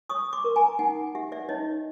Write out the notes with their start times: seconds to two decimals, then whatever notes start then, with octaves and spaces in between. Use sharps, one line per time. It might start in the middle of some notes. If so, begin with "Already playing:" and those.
0.09 C#5 C#6 D#6
0.33 C6 D6
0.44 A#4
0.56 G#5 A#5
0.79 D#4 F#5 G#5
1.15 G4 E5 F#5
1.32 D5 E5
1.49 D#4 C#5 D#5